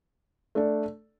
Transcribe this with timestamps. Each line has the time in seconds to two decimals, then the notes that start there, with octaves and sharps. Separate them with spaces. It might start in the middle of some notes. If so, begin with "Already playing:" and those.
0.55 A3 D4 A4 D5